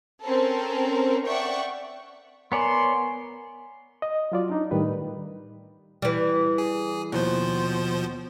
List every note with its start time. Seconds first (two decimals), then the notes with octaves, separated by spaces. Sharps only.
0.23 C4 C#4 A4 A#4
1.27 D5 E5 F#5 G5 C#6
2.52 B3 A#4 C#5 D5 G#5 A#5 C6
4.02 D#5
4.32 F#3 F4 D5
4.50 D4 D#4
4.71 A2 D#3 G3 B4
6.02 E3 G3
6.58 G#4
7.12 D#2 B2 F3 C5